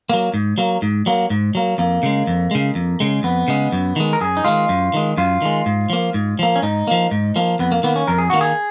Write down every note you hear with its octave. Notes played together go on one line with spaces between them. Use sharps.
F#3 A#3
G#2
F#3 A#3
G#2
F#3 A#3
G#2
F#3 A#3
F2 A#3
C#3 G#3
F2
C#3 G#3
F2
C#3 G#3
F2 B3
C#3 G#3
F#2
D#3 G#3
A#4
F#2 G#4
D#4
D#3 G#3 F4
F#2
D#3 G#3
F#2 F4
D#3 G#3
G#2
F3 A#3
G#2
F3 A#3
C#4
G#2 D#4
F3 A#3
G#2
F3 A#3
F2 B3
A#3
D#3 A#3 B3
C#4
F2 A#4
G#4
D#3 A#3 F#4
G#4